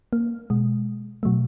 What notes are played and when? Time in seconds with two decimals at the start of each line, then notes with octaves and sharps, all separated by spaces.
0.13 A#3
0.50 B2 G#3
1.23 B2 F#3 A3